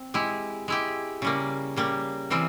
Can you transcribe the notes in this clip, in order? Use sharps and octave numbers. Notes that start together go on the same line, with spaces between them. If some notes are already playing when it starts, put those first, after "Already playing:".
Already playing: C4
G#3 E4 G4
G#3 E4 G4
C#3 G3 A#3
C#3 G3 A#3
C3 E3 G3 C4